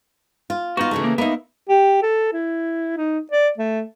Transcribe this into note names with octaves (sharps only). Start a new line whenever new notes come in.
F4
B3 D#4 F4 F#4
C#3 E3 A3
A#3
A#3 B3 D#4 E5
G4
A4
E4
D#4
D5
A3